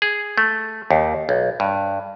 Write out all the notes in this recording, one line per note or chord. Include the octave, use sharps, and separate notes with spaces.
G#4
A3
D#2
B1
G2